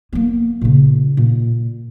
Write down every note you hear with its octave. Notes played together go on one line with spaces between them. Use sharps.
A#3 B3
A#2 C#3
A#2